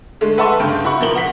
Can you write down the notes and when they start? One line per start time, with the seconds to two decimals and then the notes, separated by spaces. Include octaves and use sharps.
0.21 D3 G#3 A3
0.37 B4 E5 F#5 A5 C6 C#6
0.60 G2 C#3 G5
0.84 E4 F#4 B5 C#6
0.99 B2 F3 A#4 F#7
1.16 F#5 B6